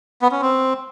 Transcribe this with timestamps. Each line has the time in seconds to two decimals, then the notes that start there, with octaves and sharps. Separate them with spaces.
0.22 B3
0.32 C#4
0.41 C4